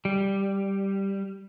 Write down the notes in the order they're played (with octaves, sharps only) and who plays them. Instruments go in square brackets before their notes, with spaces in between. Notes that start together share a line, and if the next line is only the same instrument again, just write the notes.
[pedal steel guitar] G3